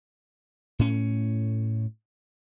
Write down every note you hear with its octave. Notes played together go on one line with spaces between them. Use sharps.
A2 C#4